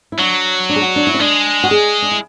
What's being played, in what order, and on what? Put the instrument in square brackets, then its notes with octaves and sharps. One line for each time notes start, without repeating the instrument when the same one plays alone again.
[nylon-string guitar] E4
[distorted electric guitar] F#3 [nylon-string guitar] D4
[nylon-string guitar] D4
G#4
F#4
D4
E4
C#4
[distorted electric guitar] G#3 [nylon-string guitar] D4
[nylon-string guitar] F#4
G#4
D4
E4